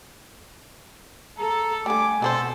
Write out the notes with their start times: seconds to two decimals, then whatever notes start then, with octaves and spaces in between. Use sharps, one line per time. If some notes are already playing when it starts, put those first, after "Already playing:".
1.38 A4 A#5
1.86 D3 G3 A3 G#5 D6
2.22 B2 D3 C4 A4 C5